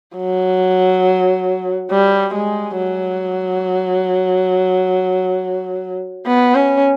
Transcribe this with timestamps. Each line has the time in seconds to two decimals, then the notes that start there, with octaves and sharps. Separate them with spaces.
0.17 F#3
1.91 G3
2.34 G#3
2.77 F#3
6.26 B3
6.55 C#4